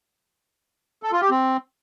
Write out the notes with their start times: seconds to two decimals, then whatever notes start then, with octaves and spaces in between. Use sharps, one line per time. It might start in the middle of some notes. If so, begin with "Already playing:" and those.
1.03 A4
1.12 F4
1.21 G4
1.31 C4